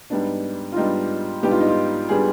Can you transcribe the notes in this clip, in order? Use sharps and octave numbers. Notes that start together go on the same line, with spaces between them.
G#2 G3 B3 D4
F4
G#2 G3 B3 D4 D#4
G#2 G3 B3 D4 G4
F4
D#4
F4
G3 B3 D4 G#4